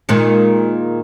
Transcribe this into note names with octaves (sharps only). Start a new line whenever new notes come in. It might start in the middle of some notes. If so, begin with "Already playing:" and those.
A#2 D#3 G#3